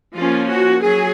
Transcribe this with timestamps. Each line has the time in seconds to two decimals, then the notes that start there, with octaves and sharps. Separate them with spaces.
0.16 F3 A#3 C#4 F4
0.50 F#4
0.83 F#3 G#4